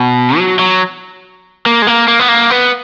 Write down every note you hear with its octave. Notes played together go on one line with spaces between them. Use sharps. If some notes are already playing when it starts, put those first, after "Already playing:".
Already playing: B2
F#3
F#3
A#3
G#3
A#3
A#3
B3
A#3
B3